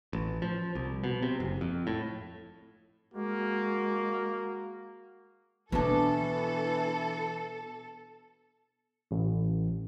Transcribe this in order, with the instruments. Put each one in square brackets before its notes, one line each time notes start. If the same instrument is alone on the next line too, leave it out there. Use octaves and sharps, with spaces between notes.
[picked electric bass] A1
F3
C2
B2
C3
F#1
F2
A2
[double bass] G#3 [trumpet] A#3 [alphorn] F#4
[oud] B2 D4 [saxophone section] E3 [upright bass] B3 [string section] A4
[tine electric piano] A1